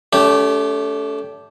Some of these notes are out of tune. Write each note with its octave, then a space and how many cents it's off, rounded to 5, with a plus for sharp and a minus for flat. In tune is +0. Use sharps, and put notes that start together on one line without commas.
A3 -10 C#4 +40 G4 +0